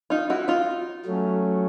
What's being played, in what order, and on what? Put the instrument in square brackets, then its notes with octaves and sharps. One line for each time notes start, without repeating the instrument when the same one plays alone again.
[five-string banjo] D#4 F4
E4 F#4
D#4 F4
[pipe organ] F#3 A3 C#4